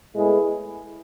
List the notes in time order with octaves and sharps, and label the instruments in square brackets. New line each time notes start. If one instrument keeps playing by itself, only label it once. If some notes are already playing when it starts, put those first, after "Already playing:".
[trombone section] A2 G#3 B3 E4 G#4